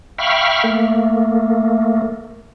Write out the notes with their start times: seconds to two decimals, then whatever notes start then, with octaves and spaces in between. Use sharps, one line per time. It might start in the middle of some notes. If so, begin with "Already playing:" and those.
0.18 E5 F5 G5 B5 C#6 F6
0.64 A3 A#3